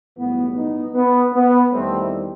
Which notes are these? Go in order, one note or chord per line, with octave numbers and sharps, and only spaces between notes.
B1 A2 E3 G3 B3
B3 D#4
B3
B3
E2 D#3 G3 A3 C4